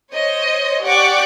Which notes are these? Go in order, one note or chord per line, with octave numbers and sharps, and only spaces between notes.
C5 C#5 D#5
G4 D5 F#5 C#6 D6